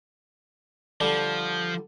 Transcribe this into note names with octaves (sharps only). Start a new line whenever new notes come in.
D3 F3 G3